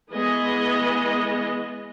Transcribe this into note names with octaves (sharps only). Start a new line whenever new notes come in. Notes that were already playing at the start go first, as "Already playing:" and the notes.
E3 G#3 B3 G#4 D#5